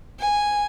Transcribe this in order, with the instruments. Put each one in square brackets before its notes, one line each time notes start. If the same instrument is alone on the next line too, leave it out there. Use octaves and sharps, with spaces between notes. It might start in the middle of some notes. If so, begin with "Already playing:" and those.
[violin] G#5